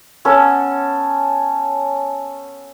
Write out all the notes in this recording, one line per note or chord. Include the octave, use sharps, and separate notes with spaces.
B3 C#4 A4